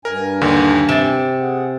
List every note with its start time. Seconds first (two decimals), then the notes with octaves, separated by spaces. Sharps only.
0.05 G2 A#4 G#5
0.41 D#2 D3 D#3
0.89 C3 A6 E7
1.41 G#4 F#5